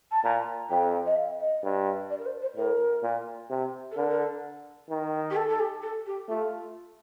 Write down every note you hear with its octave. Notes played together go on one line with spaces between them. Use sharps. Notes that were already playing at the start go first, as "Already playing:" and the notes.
A5
A#2 A#5
F2 G5
D#5
F5
D#5
G2
D5
A#4
C5
C5
A2 A#4
A#2
C3
A4
D3 A#4
A#4
A4
D#3
G4
A4
A4
G4
A4
G4
A3 F4